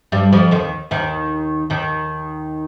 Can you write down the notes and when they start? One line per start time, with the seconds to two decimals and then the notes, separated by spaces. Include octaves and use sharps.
0.12 G2 G3
0.33 F2 F3
0.51 D#2 D#3
0.91 D#2 D#3
1.70 D#2 D#3